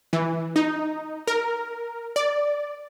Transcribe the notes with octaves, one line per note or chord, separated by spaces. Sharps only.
E3
D#4
A#4
D5